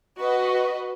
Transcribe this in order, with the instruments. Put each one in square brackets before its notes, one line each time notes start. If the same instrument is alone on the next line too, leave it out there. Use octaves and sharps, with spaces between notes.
[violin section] F#4 B4 D#5